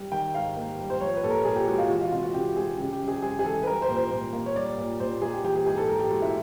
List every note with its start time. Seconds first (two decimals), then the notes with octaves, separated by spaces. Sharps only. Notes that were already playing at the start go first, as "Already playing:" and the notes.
Already playing: G3
0.12 D#3 G5
0.35 G#2 F5
0.56 A#3
0.79 G3
0.90 C5
1.01 F3 C#5
1.16 B4
1.23 A#2 A4
1.30 A#4
1.45 A#2 G#4
1.56 G4
1.68 G#3 F#4
1.78 F4
1.90 E3 F#4
2.01 F4
2.11 C3 F4
2.23 F#4
2.34 C3 G4
2.56 G#3 G#4
2.78 C#3 G4
2.93 G4
3.01 F#2
3.08 G#4
3.22 G#3 G#4
3.39 G#4
3.44 E3 A4
3.63 B4
3.67 G3 A#4
3.82 C5
3.89 A#2
3.96 C5
4.11 A#2 C5
4.33 A#3
4.46 C#5
4.55 G3 D5
4.78 A#2
5.00 A#2 C5
5.22 A#3 G#4
5.33 G4
5.44 E3 G4
5.55 G#4
5.66 G#2 G#4
5.78 A4
5.89 G#2 A#4
6.00 G4
6.11 G#3 F#4
6.22 E4